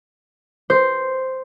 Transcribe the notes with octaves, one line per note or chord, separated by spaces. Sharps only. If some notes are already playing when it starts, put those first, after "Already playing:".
C5